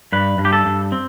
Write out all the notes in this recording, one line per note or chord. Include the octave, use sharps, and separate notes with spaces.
G2 B4
G2
G4
A4
G2
C4